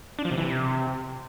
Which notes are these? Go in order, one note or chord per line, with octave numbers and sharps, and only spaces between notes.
D4
F3
C3
E3
C3